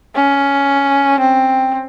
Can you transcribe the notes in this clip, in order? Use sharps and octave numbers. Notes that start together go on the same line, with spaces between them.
C#4
C4